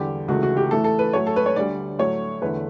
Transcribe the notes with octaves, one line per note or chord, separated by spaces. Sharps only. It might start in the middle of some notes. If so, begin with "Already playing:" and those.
Already playing: E2 D3 G3 G4
C#2 C#3 E3 A3 F#4
F#4
G4
A2 E3 A3 A4
A4
B4
A2 F#3 A3 C#5
A4
B4
C#5
D2 D3 G3 D5
A2 F#3 A3 C#5
E2 D3 A3 B4